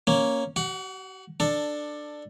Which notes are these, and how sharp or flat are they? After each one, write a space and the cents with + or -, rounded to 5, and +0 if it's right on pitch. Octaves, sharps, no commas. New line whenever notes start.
A#3 +0 C#4 +0
F#4 +45 F#5 +0
D4 +15 A4 +10